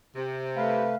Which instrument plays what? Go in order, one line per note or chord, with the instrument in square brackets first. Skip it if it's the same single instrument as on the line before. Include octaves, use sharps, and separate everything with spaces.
[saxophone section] C3
[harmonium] A3 B4 [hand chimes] F5 F6 C7